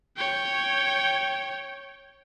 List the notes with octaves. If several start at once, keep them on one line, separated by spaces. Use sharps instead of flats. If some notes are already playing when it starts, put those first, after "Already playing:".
C#5 G5